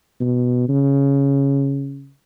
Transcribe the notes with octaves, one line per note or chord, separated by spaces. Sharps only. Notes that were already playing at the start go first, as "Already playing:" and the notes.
B2
C#3